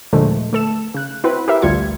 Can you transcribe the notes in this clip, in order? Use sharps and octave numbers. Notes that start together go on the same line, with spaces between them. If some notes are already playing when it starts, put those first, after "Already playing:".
D#2 A#2 D3 F3 G#3 A3
A3 A4 E7
C#3 F#6
C4 E4 F#4 B4
G4 A#4 B4 E5
A1 D2 G3 F4 G#6 C#7